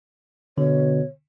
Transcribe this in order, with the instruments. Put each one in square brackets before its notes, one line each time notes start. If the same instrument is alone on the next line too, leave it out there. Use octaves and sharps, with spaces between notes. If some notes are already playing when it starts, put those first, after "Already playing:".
[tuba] B2 [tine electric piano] D3 [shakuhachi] C#5